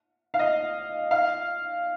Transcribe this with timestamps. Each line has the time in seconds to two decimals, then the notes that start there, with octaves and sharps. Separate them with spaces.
0.34 F5
0.39 D#5
1.11 F5